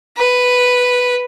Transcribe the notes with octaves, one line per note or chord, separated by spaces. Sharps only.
B4